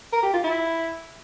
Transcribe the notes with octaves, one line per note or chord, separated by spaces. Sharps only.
A#4
G4
F4
E4